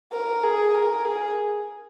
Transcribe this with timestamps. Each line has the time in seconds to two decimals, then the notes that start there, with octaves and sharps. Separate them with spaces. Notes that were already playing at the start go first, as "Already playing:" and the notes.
0.13 A#4
0.43 G#4
0.74 A#4
1.05 G#4